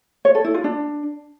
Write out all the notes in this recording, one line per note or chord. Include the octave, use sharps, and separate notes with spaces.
C#5
A4
E4
F4
D4